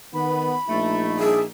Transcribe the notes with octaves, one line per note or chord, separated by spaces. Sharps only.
D#3 B3 B5
A#1 A3 D#4
G3 D4 G#4 E5